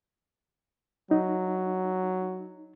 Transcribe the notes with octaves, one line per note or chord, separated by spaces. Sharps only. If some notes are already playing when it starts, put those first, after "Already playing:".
F#3 D#4